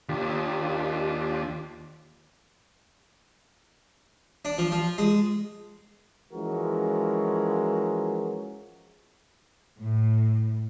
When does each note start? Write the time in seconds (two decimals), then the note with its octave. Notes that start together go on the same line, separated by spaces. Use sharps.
0.09 D#2 D4 F4 G4
4.45 D4
4.58 F3
4.72 F3
4.98 G#3
6.33 E3 F3 G#3 C#4 F#4 A#4
9.79 A2